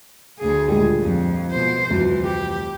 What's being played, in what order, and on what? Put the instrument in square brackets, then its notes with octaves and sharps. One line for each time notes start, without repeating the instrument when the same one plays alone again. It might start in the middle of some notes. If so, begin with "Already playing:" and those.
[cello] D2 G#4
[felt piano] C#2 A#2 G3
[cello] F2
B2 C5
[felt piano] F1 D2 G2 [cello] E3
[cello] G4